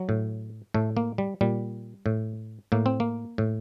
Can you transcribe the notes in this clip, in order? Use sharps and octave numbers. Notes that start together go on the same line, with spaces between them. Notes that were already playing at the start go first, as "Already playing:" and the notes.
Already playing: F#3
A2
A2 A3
A#3
G3
A#2 G3
A2
A2 A#3
C4
A#3
A2